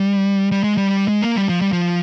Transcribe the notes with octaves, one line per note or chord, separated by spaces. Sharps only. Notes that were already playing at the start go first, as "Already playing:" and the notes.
Already playing: G3
G3
G#3
G3
G#3
A#3
G3
F3
G3
F3